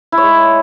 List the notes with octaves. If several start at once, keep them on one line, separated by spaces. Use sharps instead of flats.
E4
C#5
G#3